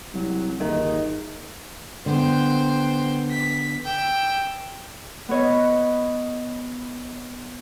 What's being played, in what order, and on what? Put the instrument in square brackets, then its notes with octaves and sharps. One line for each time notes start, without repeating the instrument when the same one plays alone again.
[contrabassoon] C2 [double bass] F#3
[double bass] G1 [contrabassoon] D#2 [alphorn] D#4 [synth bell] G#4 A#4 E5
[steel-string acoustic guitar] D3 B3 [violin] C5 G5
[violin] B6
G5 E6
[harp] B3 B4 C#5 D#5